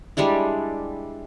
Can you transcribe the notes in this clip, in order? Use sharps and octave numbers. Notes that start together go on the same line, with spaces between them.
G3 G#3 D4 E4